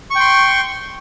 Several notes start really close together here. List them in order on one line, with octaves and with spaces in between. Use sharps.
C#6 G5 C6